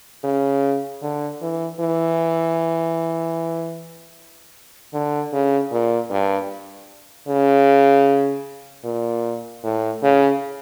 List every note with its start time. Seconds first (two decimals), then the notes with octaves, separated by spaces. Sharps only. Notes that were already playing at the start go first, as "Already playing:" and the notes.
0.24 C#3
1.02 D3
1.42 E3
1.81 E3
4.94 D3
5.33 C#3
5.72 A#2
6.10 G2
7.28 C#3
8.84 A#2
9.64 A2
10.03 C#3